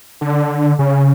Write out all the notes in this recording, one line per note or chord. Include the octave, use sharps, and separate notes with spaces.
D3
C#3